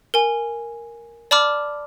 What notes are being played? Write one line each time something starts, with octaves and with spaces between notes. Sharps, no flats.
A#4 G#5
D5 A5 B5 D6 F6